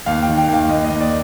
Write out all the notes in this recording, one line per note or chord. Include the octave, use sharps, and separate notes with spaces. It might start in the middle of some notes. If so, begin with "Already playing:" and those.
D#2 F5
D#3 G5
G5
D#2 F5
D#2 D#5
D#5
D#2
D5